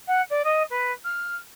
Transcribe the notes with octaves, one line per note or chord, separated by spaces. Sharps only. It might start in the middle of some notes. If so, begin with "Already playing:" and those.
F#5
D5
D#5
B4
F6